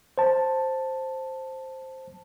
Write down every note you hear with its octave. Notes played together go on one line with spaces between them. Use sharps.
C5 A5